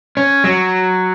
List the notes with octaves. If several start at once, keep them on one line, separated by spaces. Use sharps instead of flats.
C#4
F#3